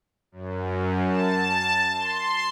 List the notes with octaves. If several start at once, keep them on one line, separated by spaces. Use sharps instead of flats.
F#2
A5
C6